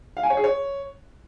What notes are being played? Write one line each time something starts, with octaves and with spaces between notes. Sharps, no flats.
F5
G#5
C#5
G#4
C#5